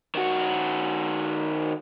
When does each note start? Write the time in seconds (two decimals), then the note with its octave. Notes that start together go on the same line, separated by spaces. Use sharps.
0.15 D#3 F#4